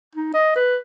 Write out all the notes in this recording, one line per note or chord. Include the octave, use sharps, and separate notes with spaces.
D#4
D#5
B4